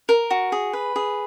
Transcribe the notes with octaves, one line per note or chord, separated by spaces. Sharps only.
A#4
F#4
G#4
B4
G#4